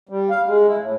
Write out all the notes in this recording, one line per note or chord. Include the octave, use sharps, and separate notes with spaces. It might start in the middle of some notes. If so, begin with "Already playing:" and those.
G3
F5
G#3
E4
A2